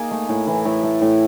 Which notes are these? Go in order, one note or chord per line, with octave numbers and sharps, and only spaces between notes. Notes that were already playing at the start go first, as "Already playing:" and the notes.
Already playing: A#3 D#4 G#4
A3
A2
E3
A2
A3
A2